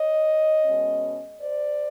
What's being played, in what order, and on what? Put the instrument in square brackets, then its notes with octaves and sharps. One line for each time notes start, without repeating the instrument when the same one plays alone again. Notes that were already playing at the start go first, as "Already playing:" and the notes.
Already playing: [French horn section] C#5 D#5
B2 G#3 C#4
C5 D5